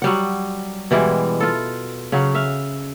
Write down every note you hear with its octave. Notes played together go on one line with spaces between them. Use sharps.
F#3 G3 F#5
B2 E3 G3 G#3
F4 A4
C#3 F#3 F5
E5 F5